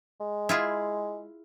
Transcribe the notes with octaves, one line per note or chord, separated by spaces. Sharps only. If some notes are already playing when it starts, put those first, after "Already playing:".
G#3
E4 F4 G#4